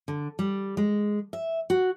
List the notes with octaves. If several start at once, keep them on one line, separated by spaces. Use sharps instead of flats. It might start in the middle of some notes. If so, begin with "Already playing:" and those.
D3
G3
G#3
E5
F#4